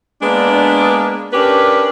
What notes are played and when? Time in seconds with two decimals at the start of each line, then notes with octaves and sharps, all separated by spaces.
0.23 G#3 A#3 B3 D4
1.33 C#4 D4 G4 A#4 B4